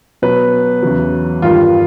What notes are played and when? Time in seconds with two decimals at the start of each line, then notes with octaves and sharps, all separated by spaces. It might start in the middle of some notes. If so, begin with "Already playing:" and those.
0.22 B2 F#3 B4
0.82 E2 C#3 F#3
1.42 G2 D#3 G3 F4